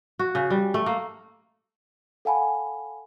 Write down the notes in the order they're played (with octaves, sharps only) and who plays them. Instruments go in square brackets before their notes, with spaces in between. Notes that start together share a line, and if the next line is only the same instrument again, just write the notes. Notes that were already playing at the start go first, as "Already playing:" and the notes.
[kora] F#4
C#3
G3
A3
A#3
[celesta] A4 F5 F#5 G#5 A5 B5